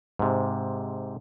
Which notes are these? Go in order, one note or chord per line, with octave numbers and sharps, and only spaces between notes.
G#2 C3